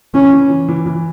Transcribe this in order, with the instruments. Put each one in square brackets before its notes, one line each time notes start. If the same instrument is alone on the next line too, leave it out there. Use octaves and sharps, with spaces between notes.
[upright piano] E3 [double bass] C#4
[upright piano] E3
E3
E3
E3